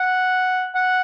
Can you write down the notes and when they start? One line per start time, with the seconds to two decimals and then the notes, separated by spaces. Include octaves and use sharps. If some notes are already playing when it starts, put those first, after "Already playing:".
Already playing: F#5
0.75 F#5